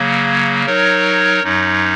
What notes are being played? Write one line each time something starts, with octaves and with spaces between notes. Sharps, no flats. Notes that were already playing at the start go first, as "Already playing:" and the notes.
Already playing: C#3 F#3 A#3
F#3 D#4 A#4 C#5
F#2 F#3 D#4